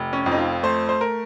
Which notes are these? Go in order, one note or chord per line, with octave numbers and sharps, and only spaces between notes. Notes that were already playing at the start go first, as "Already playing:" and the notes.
Already playing: F1
C#4
F2
D#4
F4
A3 C5
C5
A#4